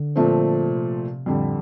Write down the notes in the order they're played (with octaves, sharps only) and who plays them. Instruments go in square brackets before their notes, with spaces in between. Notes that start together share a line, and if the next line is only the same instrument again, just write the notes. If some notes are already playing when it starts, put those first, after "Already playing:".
Already playing: [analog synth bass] D3
[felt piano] A#2 F3 A3 C4
[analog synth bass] C3
[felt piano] F2 D3 G3 [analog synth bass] A2